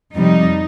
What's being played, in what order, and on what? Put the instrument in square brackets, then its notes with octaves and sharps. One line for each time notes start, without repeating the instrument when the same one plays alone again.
[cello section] F2 C3 G3 D#4